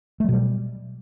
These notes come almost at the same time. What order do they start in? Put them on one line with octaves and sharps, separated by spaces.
A3 F#3 B2 G3